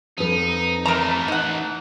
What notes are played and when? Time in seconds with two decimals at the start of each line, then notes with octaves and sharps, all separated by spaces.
0.18 F2 D#4 B4
0.86 E3 A3 A#4 A#5
1.28 D#4 F#5